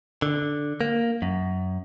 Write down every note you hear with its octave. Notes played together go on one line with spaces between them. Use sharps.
D3
A#3
F#2